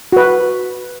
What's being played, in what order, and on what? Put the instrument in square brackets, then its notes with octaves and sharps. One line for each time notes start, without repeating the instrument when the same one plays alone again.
[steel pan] F#4 B4